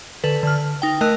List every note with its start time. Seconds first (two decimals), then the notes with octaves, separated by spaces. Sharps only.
0.24 D3 A4 B4
0.43 D3 F6
0.82 D#4 G5
1.01 A3 A#4 D#5 F#6